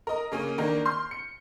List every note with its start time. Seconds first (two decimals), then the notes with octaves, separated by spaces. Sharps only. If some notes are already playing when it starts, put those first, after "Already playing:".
0.07 A#4 D#5
0.32 C#3 A#3 C#4
0.58 D#3 A#3 D4 A#4
0.86 C6 F6 G6
1.11 C#7